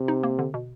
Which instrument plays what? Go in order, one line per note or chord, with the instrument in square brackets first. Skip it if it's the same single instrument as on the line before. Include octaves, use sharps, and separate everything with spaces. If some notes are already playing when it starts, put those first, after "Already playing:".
Already playing: [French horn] C3
[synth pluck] D#4
A#3
D3
B2